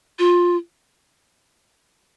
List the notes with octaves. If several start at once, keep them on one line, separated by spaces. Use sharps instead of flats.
F4